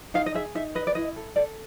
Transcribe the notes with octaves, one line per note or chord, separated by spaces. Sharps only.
D#4 F5
D#5
G#4 E5
D#4 E5
B4 D#5
D5
E4 D#5
A4
A4 D5